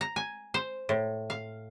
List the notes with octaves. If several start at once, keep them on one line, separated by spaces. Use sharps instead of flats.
A#5
G#5
C5
A2
F5